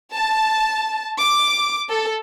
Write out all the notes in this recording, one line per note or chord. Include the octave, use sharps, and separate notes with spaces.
A5
D6
A4